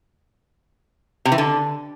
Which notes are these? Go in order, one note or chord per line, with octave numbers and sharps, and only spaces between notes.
C3
E3
D3